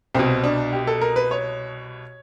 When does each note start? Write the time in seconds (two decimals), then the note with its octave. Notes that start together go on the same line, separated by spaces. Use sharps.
0.14 C2 B2 C4
0.44 D4
0.73 G4
0.87 A4
1.01 A#4
1.16 B4
1.31 C#5